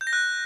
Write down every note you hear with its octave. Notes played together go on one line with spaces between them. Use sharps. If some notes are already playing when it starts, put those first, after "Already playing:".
G6
A#6
F#6